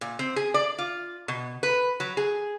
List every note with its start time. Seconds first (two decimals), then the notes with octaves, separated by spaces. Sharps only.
0.01 A#2
0.19 C4
0.36 G#4
0.54 D5
0.78 F4
1.28 B2
1.63 B4
2.00 F#3
2.17 G#4